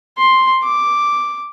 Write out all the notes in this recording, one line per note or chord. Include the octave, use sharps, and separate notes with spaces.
C6
D6